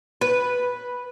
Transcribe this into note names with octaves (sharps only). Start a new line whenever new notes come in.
B4